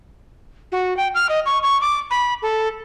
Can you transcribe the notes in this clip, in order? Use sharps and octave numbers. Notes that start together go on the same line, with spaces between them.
F#4
G5
F6
D#5
C#6
C#6
D6
B5
A4